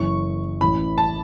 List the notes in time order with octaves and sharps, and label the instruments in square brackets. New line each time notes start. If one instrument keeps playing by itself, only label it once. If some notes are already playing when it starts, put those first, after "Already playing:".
Already playing: [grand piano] F#1 F#2 E3 C#4 E4 [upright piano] C#6
[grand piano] A1 A2 E3 C#4 E4 [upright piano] B5
[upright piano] A5